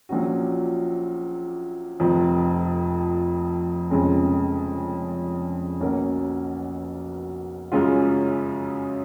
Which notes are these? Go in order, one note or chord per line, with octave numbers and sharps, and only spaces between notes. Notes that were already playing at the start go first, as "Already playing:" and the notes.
A#1 A#2 F#3 C#4 F#4
F1 F2 F3
F1 F2 C#3 G#3
B1 B2 A#3 C#4
F#2 C#3 G#3 C#4 F4